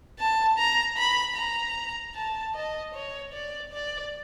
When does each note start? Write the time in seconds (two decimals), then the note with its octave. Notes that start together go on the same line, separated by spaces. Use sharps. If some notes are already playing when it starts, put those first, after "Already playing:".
0.19 A5
0.58 A#5
0.97 B5
1.37 A#5
2.15 A5
2.55 D#5
2.94 C#5
3.33 D5
3.72 D5